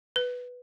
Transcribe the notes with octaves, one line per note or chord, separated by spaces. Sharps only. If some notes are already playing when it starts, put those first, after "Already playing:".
B4